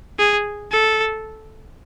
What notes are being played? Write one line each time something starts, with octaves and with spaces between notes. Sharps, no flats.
G#4
A4